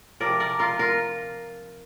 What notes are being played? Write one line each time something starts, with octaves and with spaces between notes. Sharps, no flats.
C3 F3 A#4 D5
A#4 D5
F4 A#4
F4 A#4